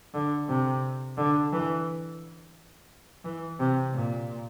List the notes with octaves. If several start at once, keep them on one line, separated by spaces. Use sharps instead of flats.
D3
C3
D3
E3
E3
C3
A#2